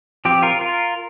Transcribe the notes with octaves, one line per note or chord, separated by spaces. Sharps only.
F3 C4 G4
F4 A#4
F4 A#4